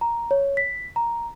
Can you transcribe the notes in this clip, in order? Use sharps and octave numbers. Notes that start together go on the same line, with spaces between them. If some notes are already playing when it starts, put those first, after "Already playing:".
A#5
C#5
B6
A#5